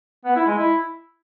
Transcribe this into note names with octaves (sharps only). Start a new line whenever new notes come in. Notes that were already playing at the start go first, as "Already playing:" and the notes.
B3
E4
G#3
E4